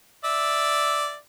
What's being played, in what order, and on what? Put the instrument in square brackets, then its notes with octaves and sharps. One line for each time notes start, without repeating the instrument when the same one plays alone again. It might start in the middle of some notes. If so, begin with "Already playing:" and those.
[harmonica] D5 E5